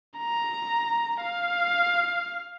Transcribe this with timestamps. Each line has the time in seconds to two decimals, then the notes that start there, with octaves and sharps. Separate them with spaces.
0.18 A#5
1.22 F5